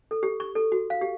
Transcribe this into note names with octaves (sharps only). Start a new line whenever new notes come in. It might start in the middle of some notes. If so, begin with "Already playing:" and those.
A4
G4
C#6
A4
F#4
F5
G4